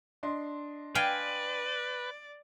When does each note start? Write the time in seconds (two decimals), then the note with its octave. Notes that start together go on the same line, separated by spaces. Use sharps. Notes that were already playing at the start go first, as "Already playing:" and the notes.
0.23 D4 D#5 C6
0.95 B4 D5 F5 G5 G#5